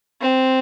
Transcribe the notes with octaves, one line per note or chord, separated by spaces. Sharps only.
C4